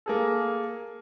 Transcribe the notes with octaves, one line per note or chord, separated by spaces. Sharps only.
A#3 G#4 A4